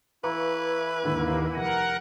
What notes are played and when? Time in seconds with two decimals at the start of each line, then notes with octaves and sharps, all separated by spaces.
0.24 E3 E4 B4 F5 A#5 C#6
1.04 D#2 G#2 D3 D#3 A#3
1.53 F1 A#4 F#5 A#6 D#7